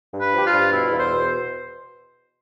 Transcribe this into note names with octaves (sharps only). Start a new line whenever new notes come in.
G2
B4
F3 G4
F4
G2
B2 E4
E2
C5
B2